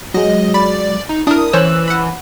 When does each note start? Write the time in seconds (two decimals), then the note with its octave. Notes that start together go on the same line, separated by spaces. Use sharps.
0.14 F#3 G#3 D#5
0.54 D5 B5
1.09 D#4
1.27 D4 E4 A#4 D#6
1.53 E3 C#4 C5 C#5 E6 F#6
1.88 F#5 B5